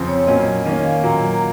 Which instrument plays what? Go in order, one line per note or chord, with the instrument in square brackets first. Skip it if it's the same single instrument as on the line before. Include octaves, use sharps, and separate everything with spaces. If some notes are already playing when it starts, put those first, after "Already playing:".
Already playing: [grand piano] F2 C#3 F3 C4
[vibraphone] C#5
[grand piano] A#2 F#3 A#3 C#4 [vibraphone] D#5
[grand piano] D#3 A#3 C#4 [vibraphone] D#5
[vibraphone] F5
[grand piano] A#2 F#3 A#3 [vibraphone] A#5
[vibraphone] A#5